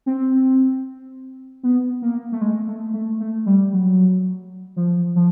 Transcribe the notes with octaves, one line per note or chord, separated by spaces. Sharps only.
C4
B3
A#3
A3
G#3
A3
A3
A3
G3
F#3
F3
F3